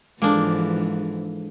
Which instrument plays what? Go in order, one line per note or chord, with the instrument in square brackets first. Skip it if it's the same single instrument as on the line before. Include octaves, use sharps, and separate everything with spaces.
[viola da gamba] G#2 E3 F3 [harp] G#3 A4 [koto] A#3 D4